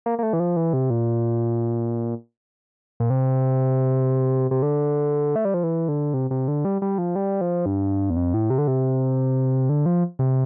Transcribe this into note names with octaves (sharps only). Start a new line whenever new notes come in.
A#3
A#3
A3
E3
F3
E3
C3
A#2
A#2
C3
C3
D3
A3
G3
F3
E3
D3
C3
C3
D3
G3
G3
F3
G3
F3
G2
E2
F2
A2
C3
D3
C3
D3
F3
C3